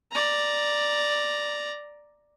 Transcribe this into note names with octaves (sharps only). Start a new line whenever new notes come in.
D5 A#5